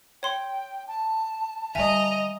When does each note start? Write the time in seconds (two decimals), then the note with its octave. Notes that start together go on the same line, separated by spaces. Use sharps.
0.23 C#5 G5 C6
0.88 A5
1.75 D3 G3 D#5 E5 G#5 A#5